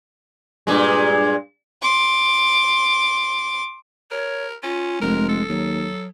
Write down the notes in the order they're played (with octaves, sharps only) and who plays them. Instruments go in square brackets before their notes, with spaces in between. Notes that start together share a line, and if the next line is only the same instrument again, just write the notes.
[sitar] G2 A#2 G#3
[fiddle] C6 D6
[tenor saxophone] A#4 [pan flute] C#5
[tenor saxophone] C#4 [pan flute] F4
[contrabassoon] F1 [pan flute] G#3 [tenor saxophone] A#4
[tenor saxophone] A4
[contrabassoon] D#2 [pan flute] F#3